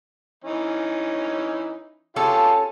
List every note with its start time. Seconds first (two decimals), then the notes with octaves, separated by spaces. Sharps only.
0.44 E3 C#4 D#4
2.16 C#4 F4 G4 A4 C#5